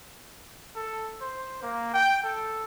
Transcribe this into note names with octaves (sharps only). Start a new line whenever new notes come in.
A4
C5
A#3
G5
A4